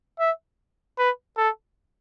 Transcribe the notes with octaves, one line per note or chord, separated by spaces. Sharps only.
E5
B4
A4